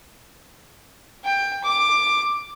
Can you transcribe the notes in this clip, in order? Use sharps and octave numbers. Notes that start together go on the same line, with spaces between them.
G5
D6